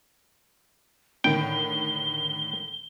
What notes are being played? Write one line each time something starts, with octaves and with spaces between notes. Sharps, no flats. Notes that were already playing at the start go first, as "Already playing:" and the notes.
A2 D3 D#3 G5 G7